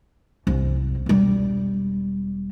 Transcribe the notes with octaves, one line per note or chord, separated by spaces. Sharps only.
C2 F#2
E1 G3